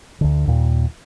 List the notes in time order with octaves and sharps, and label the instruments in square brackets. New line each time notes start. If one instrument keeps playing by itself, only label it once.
[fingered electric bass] D2 D3
D#2 A#2